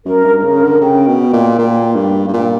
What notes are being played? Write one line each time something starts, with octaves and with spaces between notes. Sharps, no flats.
F#2 A#4
G2
C#3 A#4
D3
C#3 G5
B2
A#2
A#2
G2
G2
A#2 G5